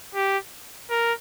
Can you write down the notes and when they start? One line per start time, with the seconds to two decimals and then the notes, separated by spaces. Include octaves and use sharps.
0.15 G4
0.90 A#4